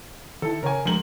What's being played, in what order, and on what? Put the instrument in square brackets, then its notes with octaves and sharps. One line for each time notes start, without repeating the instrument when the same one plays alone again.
[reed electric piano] D#3 E4 [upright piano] A4
[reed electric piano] C#3 C#5 [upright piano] A#4 G#5
[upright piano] D2 A#4 F#7 [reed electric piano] F3 G#3